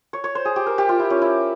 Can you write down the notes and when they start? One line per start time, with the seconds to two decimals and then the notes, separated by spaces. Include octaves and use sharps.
0.13 C#5
0.24 C#5
0.35 C5
0.45 G#4
0.56 G4
0.66 A#4
0.78 G4
0.89 F4
0.99 E4
1.10 C#4
1.22 E4